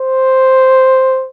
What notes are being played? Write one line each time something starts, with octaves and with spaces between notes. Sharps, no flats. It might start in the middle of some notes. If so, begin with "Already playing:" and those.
Already playing: C5